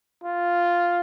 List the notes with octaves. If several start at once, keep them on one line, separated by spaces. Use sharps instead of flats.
F4